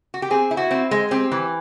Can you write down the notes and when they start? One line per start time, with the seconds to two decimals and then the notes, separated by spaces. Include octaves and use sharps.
0.14 F#4
0.22 G4
0.31 C4 G#4
0.51 E4
0.57 F#4
0.71 C4
0.91 G#3
1.11 C4 G4
1.32 E3